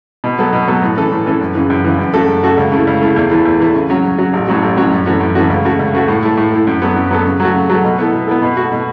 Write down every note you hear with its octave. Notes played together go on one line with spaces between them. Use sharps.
B2
F#3 B3 A4
B2
F#3 B3 A4
A2
E3 C#4 A4
A2
E3 C#4 A4
F#2
C#3 E3
F#2
C#3 E3
F#2
C#3 A3 F#4 A4
F#2
C#3 A3 F#4 A4
C#2
C#3 A3 E4
C#2
C#3 A3 E4
E2
E3 A3 E4
E2
E3 A3 E4
C#3
F#3 C#4 F#4
C#3
F#3 C#4 F#4
A1
A2 F#3 C#4 F#4
A1
A2 F#3 C#4 F#4
F#2
E3 A3 C#4 F#4
F#2
E3 A3 C#4 F#4
C#2
C#3 A3 F#4
C#2
C#3 A3 F#4
A2
A3 E4
A2
A3 E4
F#2
F#3 B3 A4
F#2
F#3 B3 A4
C#3
F#3 A3 F#4
C#3
F#3 A3 F#4
B2
B3 E4 A4
B2
B3 E4 A4
B2
A3 F#4
B2